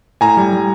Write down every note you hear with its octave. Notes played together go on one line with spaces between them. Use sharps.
A2 G#5 A#5
G3
G3